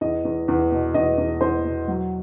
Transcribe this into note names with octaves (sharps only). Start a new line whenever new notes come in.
E2 D#5
E2
E2
B2
E2 D#5
E2
E2 C5
B2
F#3